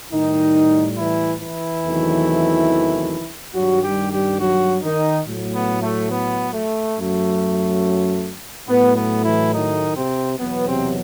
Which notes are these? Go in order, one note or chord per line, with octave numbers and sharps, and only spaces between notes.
A2 D#3 G3 D#4
E3 E4
E3 E4
E2 C3 D#3 F#3 A3
G2 D#3 F#3 G3 F#4
G3 G4
G3 G4
F#3 F#4
D#3 D#4
A2 F#3 A3
B3
A3
B3
A3
F#2 F#3 A3
A2 F#3 A3 B3
B3
E3 E4
D#3 D#4
C3 C4
E2 B2 F#3 B3
C3 C4